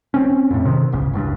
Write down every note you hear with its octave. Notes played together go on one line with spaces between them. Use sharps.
C4 C#4
F2 A2
C3 D#3
D1 G1 C#2 C#3
F#1 C#2 G2